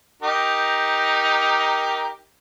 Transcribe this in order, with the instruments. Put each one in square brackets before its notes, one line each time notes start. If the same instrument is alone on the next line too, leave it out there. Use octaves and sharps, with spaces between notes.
[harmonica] D#4 G4 A#4